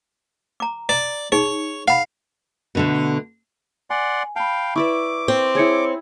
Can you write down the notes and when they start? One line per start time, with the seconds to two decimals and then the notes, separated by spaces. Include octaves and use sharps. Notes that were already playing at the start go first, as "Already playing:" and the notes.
0.60 A#5 D6
0.89 D5 A#5
1.32 D#4 G#4 C#5
1.88 F5 F#5 B5
2.75 B2 D3 A3
3.90 D5 F#5 G#5 C6
4.36 F5 G5 A5 B5
4.75 E4 B4 D5 E5 C#6 D6
5.28 C4
5.55 E4 G#4 C#5 G#6 C#7